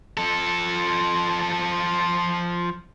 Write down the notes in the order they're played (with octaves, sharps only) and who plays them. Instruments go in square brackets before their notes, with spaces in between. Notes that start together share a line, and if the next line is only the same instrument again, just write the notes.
[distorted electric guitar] F3 A4